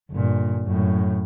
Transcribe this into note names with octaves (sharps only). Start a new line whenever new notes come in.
G1 A#2
F#2 A2